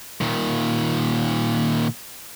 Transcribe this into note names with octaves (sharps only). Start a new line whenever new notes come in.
A#2 D#3